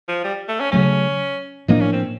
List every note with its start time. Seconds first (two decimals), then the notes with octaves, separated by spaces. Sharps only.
0.08 F3
0.24 G3
0.48 A3
0.60 C#4
0.72 C#3 F#3 A3 C#4
1.68 A2 F3 A#3 D4 D#4
1.81 C#4
1.93 C4